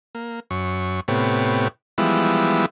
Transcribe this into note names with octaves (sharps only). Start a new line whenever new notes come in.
A#3
F#2 C#6
A2 C3 B3 G4 C#5
E3 F3 G3 G#3 B3 E4